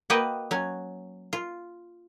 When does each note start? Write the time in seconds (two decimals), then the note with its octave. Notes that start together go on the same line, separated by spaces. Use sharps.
0.10 A#3 F#4 B4 D#5 G5
0.51 F#3 C#4
1.33 F4